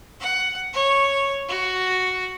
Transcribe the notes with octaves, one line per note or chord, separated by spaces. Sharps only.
F#5
C#5
F#4